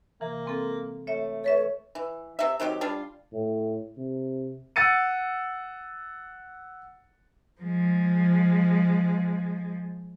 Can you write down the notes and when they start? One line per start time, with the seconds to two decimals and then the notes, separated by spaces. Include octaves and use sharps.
0.21 C3 E3 A#3
0.46 G#3 C4 A4
1.07 A3 C#5 E5
1.44 A4 B4 C#5 E5
1.95 E3
2.39 C3 E5
2.60 D#3 F#3 C4 G4
2.81 G3 D4 F4
3.33 A2
3.97 C3
4.76 F#5 E6 A6 C#7 D#7
7.62 F3 G#3